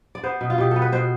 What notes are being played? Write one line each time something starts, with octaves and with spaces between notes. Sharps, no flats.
D5
B3 C5
B2
F4
B2 G4
B3 A4
B4
B2 C5